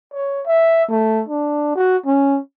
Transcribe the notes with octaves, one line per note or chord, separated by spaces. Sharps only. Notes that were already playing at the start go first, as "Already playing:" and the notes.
C#5
E5
A3
D4
F#4
C#4